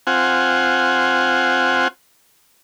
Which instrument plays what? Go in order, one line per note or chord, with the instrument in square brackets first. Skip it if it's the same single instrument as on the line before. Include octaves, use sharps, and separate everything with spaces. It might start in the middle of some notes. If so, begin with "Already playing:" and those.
[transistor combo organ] C4 F4 F#5 G#5